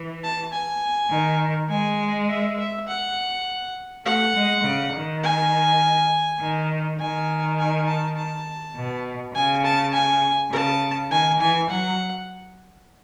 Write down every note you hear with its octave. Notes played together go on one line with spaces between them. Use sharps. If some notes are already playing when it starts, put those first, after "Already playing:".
Already playing: E3
A5
G#5
D#3
G#3 G#5
E5
E5
F#5
A3 F#5
G#3
C#3
D#3
G#5
D#3
D#3 G#5
G#5
A5
A5
B2
C#3 G#5
A5
G#5
C#3 A5
D#3 G#5
E3 G#5
F#3 F#5